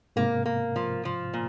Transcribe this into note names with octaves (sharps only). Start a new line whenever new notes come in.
G#2 C3 A#3
A#3
F3
F3
A#2